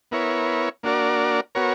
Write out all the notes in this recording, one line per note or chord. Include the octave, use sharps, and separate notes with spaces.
B3 E4 A#4 C#5
A#3 D4 F#4 A#4 D5
B3 F#4 A#4 C#5